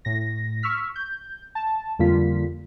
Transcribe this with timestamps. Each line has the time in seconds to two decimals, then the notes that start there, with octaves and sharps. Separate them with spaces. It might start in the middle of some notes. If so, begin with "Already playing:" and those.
0.05 A2 A#6
0.63 C#6 E6 F6 B6
0.95 G6
1.55 A5
1.99 F2 D3 G3 A#3 F4 B6